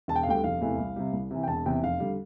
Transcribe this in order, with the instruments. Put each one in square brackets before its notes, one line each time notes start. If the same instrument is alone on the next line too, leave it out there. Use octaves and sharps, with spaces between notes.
[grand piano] E1 A5
G5
F5
D2 D3 G3 G5
F1 F5
E2 C3 E3 A3
C2
C3 G3
C2
C3 E3
G5
E1 A5
E2 C3 E3 G5
F1 F5
D3 G3